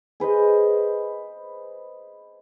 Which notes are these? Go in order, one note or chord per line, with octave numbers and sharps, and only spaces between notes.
G#4 B4 C5 D#5